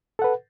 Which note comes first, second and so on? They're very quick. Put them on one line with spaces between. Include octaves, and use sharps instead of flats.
A4 F#5 B4